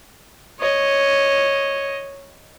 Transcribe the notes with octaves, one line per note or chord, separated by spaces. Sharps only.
C#5 D#5